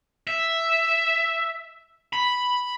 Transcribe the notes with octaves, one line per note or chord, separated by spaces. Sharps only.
E5
B5